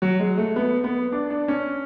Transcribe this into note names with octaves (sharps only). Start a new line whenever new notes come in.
F#3
G#3
A3
B3
B3
D4
D4
C#4